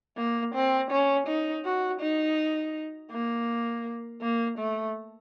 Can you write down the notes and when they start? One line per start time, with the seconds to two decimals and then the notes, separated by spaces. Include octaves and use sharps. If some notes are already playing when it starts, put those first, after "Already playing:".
0.18 A#3
0.55 C4
0.91 C#4
1.27 D#4
1.65 F#4
2.01 D#4
3.11 A#3
4.21 A#3
4.59 A3